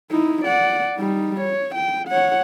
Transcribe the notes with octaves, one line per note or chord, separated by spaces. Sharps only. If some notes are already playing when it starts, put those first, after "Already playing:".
D#4 E4
D5 F#5
G3 D#4
C#5
G5
C#5 F#5